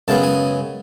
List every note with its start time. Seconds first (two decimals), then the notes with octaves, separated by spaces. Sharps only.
0.08 F#2 C#3 G#3 B3 A5
0.23 G#5